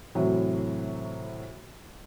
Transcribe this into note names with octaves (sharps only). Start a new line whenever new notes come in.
A2 C3 E3 F#3